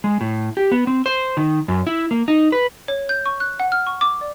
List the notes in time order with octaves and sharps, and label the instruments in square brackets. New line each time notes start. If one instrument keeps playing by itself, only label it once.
[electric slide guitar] G#3
A2
G4
B3
C4
C5
D#3
F#2
E4
A#3
D#4
B4
[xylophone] C#5
G6
C#6
F#6
F#5
F6
C#6
D6
D5